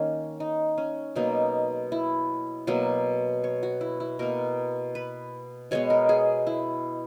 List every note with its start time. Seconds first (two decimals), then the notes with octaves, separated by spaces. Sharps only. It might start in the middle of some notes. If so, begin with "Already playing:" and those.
Already playing: D#3 A#3 C#4
0.40 D#4
0.78 C#4
1.16 B2 F#3 A#3 D#4
1.92 E4
2.67 B2 F#3 A#3
3.44 C#5
3.63 F#4
3.81 E4
4.00 E4
4.19 B2 A#3 A#4
4.95 B4
5.71 B2 G#3 B3 C#5
5.90 A#4
6.09 G#4
6.47 E4